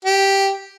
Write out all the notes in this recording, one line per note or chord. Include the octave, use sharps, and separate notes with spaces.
G4